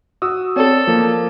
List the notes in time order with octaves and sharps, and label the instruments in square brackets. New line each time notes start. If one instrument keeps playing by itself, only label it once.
[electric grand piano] F#4 D#6 E6
[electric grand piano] C4 C#5 D5 [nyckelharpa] A4
[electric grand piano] F3 A#3